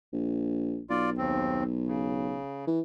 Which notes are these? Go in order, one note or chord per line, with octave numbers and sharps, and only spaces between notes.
A#1
B1 F4 D5
D#2 C4
C#3
E3